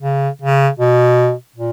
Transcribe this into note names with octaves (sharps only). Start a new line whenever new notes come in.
C#3
C#3
B2
A#2